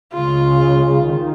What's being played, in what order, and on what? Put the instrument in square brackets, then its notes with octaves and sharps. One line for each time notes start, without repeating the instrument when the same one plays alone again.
[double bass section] C#2 C#3 G#3 [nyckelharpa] F4
[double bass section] D#3